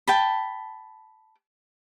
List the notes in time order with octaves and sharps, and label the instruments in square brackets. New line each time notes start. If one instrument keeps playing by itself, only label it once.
[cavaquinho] G5 A5 B5